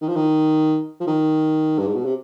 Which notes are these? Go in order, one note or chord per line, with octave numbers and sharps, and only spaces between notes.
D#3
F3
D#3
F3
D#3
G2
G#2
B2
C3